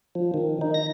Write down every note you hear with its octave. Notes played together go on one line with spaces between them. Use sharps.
F3
D#3
D#4
A#6